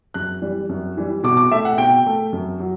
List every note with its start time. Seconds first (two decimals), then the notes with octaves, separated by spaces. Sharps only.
0.14 F#2 F#6
0.42 E3 G3
0.69 F#2
0.97 E3 G3
1.24 B2 D6
1.37 D6
1.52 A3 E5
1.65 F#5
1.78 B2 G5
2.06 A3
2.33 F#2
2.60 F#3